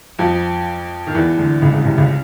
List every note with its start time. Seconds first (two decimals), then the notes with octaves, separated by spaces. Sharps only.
0.19 F2 F3
1.07 D#3
1.15 E2 E3
1.38 D2 D3
1.62 C#2 C#3
1.73 C#2 C#3
1.85 C2 C3
1.98 C#2 C#3